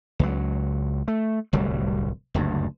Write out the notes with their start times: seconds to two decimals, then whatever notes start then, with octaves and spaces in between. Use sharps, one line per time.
0.19 C#2 F#3
1.08 A3
1.53 D1 C2 F#3 G3
2.34 F#1 D2 G2